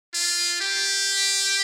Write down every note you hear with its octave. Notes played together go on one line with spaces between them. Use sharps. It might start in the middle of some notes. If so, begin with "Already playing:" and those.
F4
G4